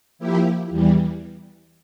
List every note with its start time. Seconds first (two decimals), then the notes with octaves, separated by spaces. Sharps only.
0.19 F3 A#3 E4 G4
0.70 E2 E3 G3